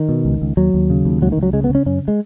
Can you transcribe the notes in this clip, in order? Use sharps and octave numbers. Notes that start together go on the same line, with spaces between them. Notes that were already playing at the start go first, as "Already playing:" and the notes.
Already playing: D#3
B2
C#2
C#2
D#2 F#3
D#2
C#3
D#2
C#2 F#3
D#3
C#2
F#3
C#3 G#3
B3
C#3
C#4
F#2 C#4
G#3